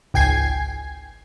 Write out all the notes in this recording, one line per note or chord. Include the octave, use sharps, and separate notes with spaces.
G#1 C#2 G5 G#5 G#6 C7